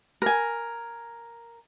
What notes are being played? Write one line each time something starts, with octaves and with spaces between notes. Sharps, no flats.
A#4 G#5